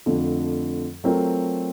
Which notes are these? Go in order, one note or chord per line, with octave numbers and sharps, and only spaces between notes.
F2 D3 F3 A3
F#3 A3 C4 F4 A#4